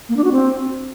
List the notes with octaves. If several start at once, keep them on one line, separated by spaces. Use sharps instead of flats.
A#3
D4
F#4
C4